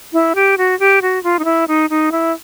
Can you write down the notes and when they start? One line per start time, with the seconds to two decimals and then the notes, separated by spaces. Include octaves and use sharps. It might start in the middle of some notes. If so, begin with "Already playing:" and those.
0.13 E4
0.35 G4
0.58 F#4
0.80 G4
1.02 F#4
1.23 F4
1.39 D#4
1.45 E4
1.68 D#4
1.90 D#4
2.12 E4